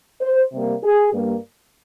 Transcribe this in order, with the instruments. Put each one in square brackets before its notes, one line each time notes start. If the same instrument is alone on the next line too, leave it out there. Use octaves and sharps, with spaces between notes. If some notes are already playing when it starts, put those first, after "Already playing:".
[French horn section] C5
C3 G3 A#3
G#4
G2 G3 A#3